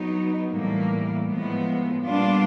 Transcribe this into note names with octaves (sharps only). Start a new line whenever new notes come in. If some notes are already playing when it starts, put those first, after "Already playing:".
Already playing: F#3 B3 D#4
A2 E3 G3 A#3
A2 F3 G#3 B3
A#2 G3 B3 D4 F4